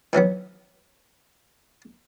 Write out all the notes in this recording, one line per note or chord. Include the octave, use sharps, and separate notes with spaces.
D#3 E3 F#3 B3